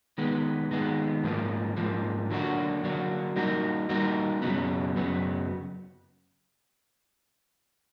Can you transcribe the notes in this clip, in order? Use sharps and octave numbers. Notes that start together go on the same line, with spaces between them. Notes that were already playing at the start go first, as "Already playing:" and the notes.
D#3 G#3 B3
D#3 G#3 B3
G#2 F3 A#3
G#2 F3 A#3
D3 F#3 A#3 D4 F#4
D3 F#3 A#3 D4 F#4
G3 A#3 D#4 F#4 A#4
G3 A#3 D#4 F#4 A#4
F#2 C#3 F#3 B3
F#2 C#3 F#3 B3